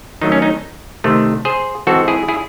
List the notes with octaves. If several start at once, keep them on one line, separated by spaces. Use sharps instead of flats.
D#3 F#3 A3 D#4
C#4
D#4
C3 D#3 A3 C4
G#4 C5
E3 G#3 C4 F#4 A4
E4 G#4
E4 G#4